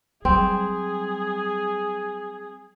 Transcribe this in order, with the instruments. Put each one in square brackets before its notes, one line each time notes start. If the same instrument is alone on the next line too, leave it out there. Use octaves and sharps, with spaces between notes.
[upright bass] F#3 G3 [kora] C4 [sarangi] G#4